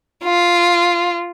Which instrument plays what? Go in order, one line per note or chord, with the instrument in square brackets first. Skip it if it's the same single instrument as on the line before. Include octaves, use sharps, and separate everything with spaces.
[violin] F4